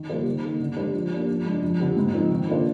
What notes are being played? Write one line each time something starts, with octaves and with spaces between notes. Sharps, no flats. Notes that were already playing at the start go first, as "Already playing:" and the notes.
Already playing: D#3
G3 A#3 F4 C5
D#3
A#3 D#4 G#4
D3
G#3 D4 G4 C5
F3
A#3 D4 G4 D5
F3
G#3 D4
F2
D3 F3 C4 G4
G#2
F3 C4 D#4
D#3
A#3 D4 F4 C5